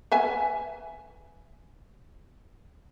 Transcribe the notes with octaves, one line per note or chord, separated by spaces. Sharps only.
B4 E5 G#5